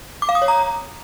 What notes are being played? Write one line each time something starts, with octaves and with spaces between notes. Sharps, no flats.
D6
F5
D#6
C#5
A#5